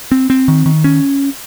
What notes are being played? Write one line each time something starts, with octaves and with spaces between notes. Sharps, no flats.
C4
C4
D#3
D#3
C#4